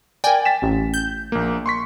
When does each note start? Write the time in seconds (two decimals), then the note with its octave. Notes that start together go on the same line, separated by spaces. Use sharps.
0.24 A#4 D5 G5 G#5
0.45 A6 B6 E7
0.62 A1
0.94 G6
1.32 A#1 A#3
1.66 C6 C#6 B6